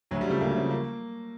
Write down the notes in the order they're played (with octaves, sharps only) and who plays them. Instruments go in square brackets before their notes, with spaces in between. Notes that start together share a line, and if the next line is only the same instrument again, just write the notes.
[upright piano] D2 [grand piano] F#3
[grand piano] G3
[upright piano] C#3 F3 [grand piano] A3
[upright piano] D2 [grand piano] A#3
[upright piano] C#3 F3
[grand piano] A#3